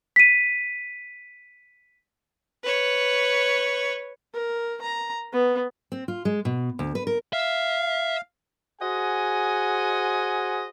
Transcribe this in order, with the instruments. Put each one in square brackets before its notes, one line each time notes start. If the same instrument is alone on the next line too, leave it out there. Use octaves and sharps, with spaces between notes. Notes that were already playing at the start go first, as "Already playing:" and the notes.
[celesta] B6 D#7
[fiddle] B4 C#5
[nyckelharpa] A#4
A#5
B3
[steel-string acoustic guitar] C4
F4
G#3
B2
D2
B4
A#4
[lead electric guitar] E5 [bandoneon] F5
[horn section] F#4 G#4 C5 D#5 F#5 G#5